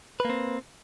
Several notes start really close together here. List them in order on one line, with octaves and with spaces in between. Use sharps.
B4 A#3 C4